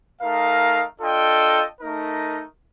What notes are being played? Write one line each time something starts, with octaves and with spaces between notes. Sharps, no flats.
A3 D#4 A#4 F5
D4 F4 A4 D#5 G5
A3 D#4 A#4